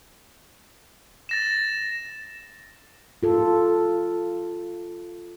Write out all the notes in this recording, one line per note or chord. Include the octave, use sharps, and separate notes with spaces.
A6 A#6 E7
F4 A4